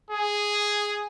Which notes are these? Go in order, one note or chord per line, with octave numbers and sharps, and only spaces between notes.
G#4